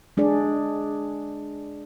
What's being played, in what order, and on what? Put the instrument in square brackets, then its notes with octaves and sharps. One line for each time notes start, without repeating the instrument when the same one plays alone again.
[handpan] G#3 D4 G#4 D5